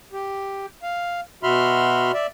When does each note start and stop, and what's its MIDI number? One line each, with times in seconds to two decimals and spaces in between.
0.13 0.66 67
0.83 1.21 77
1.43 2.12 47
1.43 2.12 66
1.43 2.12 76
1.43 2.12 83
1.43 2.12 84
1.43 2.12 89
2.13 2.27 74
2.13 2.27 76